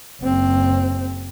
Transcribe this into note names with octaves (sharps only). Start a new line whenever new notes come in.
F#1 C4